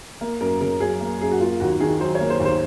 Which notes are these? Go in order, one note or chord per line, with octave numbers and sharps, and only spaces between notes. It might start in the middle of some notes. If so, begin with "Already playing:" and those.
A#3
F#2 A#4
C#3 A#4
F#3 G#4
A#3
F#2 G#4
F#4
A#3 F4
D#2 F#4
D#3 G#4
F#3 C5
C#5
A#3
C5
D#2
C5